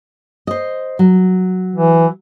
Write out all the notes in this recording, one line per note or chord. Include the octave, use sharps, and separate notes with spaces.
C5 D#5
F#3
E3